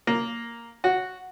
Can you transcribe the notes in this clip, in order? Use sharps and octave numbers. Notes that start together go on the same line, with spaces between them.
A#3
F#4